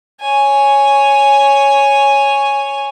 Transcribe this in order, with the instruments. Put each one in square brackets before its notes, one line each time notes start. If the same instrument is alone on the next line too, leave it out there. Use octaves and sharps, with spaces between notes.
[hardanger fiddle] C#5 G#5